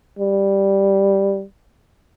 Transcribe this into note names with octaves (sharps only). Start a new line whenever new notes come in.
G3